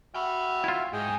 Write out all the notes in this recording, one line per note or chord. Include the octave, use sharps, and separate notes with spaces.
F#4 E5 G5 B5 F6
E4 F4
G#2 G#4 D#5 G5